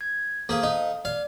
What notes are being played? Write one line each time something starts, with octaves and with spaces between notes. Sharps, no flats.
G#6
A#3 G#4 A4 C5 F5
D#4
D5 F5